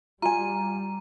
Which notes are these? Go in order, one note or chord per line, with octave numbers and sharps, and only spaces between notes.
G3 F4 G#5 A#5 D#7